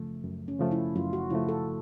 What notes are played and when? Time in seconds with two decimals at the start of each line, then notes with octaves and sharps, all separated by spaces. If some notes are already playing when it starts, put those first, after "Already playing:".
Already playing: F#2 C#3 F3 A3
0.24 F#2
0.48 C#4
0.60 C#3 F3 A3
0.71 E4
0.96 F#2 F4
1.13 F#4
1.30 C#3 F3 A3 E4
1.49 A4